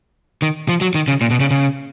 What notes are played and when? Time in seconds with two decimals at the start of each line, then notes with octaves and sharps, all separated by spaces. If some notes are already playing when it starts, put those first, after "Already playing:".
0.42 D#3
0.69 F3
0.81 F#3
0.95 D#3
1.08 C#3
1.21 A#2
1.30 B2
1.40 C#3
1.51 C#3